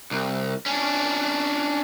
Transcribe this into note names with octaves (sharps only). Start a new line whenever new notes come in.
C2
C#4 D4